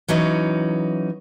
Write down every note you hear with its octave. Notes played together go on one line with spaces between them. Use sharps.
E3 F#3 C#4 D#4